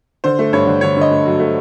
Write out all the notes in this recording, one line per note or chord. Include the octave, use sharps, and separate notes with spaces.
D3 C5
A3
G2 C#5
D3
D3 C#5
D3
D#5
A3
F#3
A3